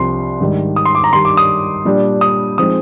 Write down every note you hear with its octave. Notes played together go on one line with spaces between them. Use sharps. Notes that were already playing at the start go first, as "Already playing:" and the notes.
Already playing: C2 C3 F3 C6
G#2 D#3 G3 D4
D#6
C6
D6
A#5
G2 D#3 G3 D4 C6
D6
D#6
A#2 G3 D4
D#6
F3 G#3 C4 D#4 D#6